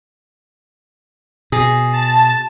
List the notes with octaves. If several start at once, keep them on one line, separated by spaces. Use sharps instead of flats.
B2 G#4
A5